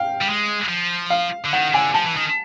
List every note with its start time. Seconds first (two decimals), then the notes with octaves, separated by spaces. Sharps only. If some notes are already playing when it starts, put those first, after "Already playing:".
Already playing: F5 G5
0.21 G3
0.27 G#3
0.69 F3
1.10 F5
1.46 D3
1.53 D#3 F#5
1.74 D3 G#5
1.94 F3 A5
2.05 E3
2.16 D#3